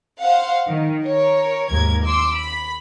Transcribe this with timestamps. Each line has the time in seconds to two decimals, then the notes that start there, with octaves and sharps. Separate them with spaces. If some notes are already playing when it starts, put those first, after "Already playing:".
0.19 C5 F5 F#5
0.69 D#3
1.03 A#4 C#5
1.69 D#2 G#2 A#4 G#6
2.03 C6 D6 E6
2.34 B5